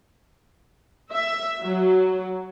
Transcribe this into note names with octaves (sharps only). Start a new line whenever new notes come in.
E5
F#3